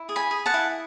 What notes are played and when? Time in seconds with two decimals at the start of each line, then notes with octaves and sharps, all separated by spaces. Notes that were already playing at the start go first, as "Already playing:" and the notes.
Already playing: E4
0.09 G#4
0.16 G#5 B5
0.31 G#4
0.46 F#5 A5
0.54 E4